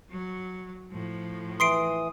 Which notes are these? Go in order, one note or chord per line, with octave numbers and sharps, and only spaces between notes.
F#3
A2 F3
E3 C6 D#6 C7 D7